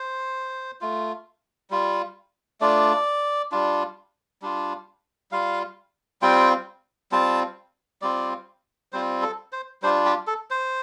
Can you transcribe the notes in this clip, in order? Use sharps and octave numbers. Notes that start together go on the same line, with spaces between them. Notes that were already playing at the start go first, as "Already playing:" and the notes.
Already playing: C5
A3 F4
G3 F4
A3 D4 F4 D5
G3 D4 F4
G3 D4 F4
G3 F4 F5
G3 C4 F4 G5
G3 C4 F4 A5
G3 C4 F4 D5
G3 C4 F4 C5
A4
C5
G3 D4 F4 C5
G4
A4
C5